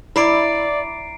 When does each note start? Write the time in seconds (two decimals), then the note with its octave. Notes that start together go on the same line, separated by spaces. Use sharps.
0.16 E4 D5 A#5 C7 D7